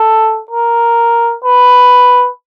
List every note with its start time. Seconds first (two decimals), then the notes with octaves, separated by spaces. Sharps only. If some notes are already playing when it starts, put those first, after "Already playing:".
Already playing: A4
0.51 A#4
1.45 B4